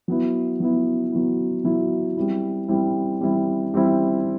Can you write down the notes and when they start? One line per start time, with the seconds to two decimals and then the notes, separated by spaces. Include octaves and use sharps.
0.08 F#3 B3 E4
0.60 F#3 B3 E4
1.12 F#3 B3 E4
1.64 F#3 B3 E4
2.17 G3 C4 E4
2.68 G3 C4 E4
3.21 G3 C4 E4
3.74 G3 C4 E4